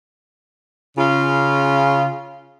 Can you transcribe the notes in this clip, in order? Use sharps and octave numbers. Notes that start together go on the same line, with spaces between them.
C#3 F4